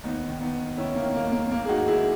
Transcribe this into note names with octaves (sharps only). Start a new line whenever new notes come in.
D#2 B3 D#4
D#3
B3 D#4
D#3
D#3 C#4 E4
A#3 C#4
D#3
A#3
D#2 A#3
G#1 A#3
G#4
D#4 F#4
G#1
E4 G#4